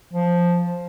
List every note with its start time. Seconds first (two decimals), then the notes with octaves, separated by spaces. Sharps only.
0.13 F3